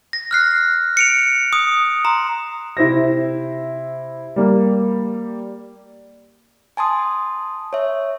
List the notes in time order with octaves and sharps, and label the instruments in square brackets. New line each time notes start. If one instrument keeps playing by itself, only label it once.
[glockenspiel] A#6
F6 F#6 C7
C#7 D7 F7
D#6
A#5 C6
[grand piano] C3 E4 C5 A#6
G3 A#3
[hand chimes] G#5 A5 C6 D#6
C#5 E5